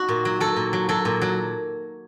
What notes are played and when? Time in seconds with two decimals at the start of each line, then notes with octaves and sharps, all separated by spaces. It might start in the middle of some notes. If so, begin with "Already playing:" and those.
Already playing: D#4 F#4
0.09 A#2
0.25 F#3
0.40 F#3 A4
0.56 A#2
0.73 F#3
0.89 F#3 A4
1.05 A#2
1.21 F#3